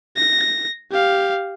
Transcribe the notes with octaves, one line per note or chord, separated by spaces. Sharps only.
A#6
G4 F5